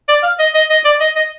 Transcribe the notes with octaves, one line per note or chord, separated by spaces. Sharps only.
D5
F5
D#5
D#5
D#5
D5
D#5
D#5